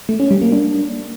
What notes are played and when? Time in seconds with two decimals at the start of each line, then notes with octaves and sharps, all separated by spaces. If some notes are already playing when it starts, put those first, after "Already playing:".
0.09 A3
0.20 C#4
0.31 G3
0.41 A#3
0.52 D4